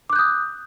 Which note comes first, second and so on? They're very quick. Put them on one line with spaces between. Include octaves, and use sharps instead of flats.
D6 F#6 G6 D#6